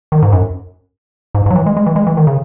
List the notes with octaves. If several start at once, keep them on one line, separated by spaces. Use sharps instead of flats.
D#3
G#2
F#2
G#2
G#2
F#3
E3
G#3
G#3
E3
G#3
E3
D#3
C#3